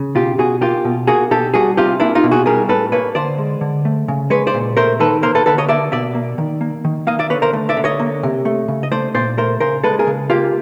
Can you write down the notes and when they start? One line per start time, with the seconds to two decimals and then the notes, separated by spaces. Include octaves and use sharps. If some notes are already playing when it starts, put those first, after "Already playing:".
Already playing: C#3
0.15 B2 F4 G4
0.38 B2 F#4 G#4
0.61 A#3 F4 G4
0.85 B2
1.07 A#3 F#4 G#4
1.31 B2 G4 A4
1.54 G3 F#4 G#4
1.77 C3 F4 G4
2.00 A#3 D4 E4
2.15 D#4 F4
2.24 B2
2.31 F#4 G#4
2.46 G3 G#4 A#4
2.69 A2 A4 B4
2.92 A#3 B4 C#5
3.15 D3 C5 D5
3.38 G#3
3.61 D3
3.85 A3
4.08 C#3
4.30 G#3 B4 C#5
4.47 C5 D5
4.54 A#2
4.77 A3 A#4 C5
5.00 D#3 A4 B4
5.22 A#3 A#4 C5
5.35 A4 B4
5.46 D3 A4 B4
5.58 C#5 D#5
5.69 A#3 D5 E5
5.92 B2 D5 E5
6.15 A#3
6.38 D#3
6.61 A#3
6.85 D#3
7.07 A#3 D#5 F5
7.19 D5 E5
7.30 D3 B4 C#5
7.42 A#4 C5
7.53 A3
7.69 D5 E5
7.77 D3
7.84 C#5 D#5
7.99 A#3
8.23 C3
8.45 A3
8.68 C#3
8.83 D#5
8.92 A3 C5 D5
9.15 A#2 C5 D5
9.37 A3 A#4 C5
9.60 C#3 A#4 C5
9.84 G#3 A4 B4
9.99 G#4 A#4
10.07 C#3
10.30 A#3 F4 G4